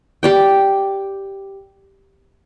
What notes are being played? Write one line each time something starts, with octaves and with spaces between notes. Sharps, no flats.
G4 D5 G5